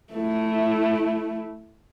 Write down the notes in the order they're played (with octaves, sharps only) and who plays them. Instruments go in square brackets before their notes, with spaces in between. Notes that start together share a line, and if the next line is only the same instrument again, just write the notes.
[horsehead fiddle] A3 E4